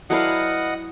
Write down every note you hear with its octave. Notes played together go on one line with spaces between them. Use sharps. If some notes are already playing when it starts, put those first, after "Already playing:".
F#3 E4 A4 B4 D5 D#5 F5 F#5